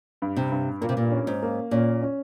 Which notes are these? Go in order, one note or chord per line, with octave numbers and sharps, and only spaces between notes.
G2
C3
G2
A#2 A#3
C3
A#2
C#4
G#2
A#3
A#2 C#4
C#4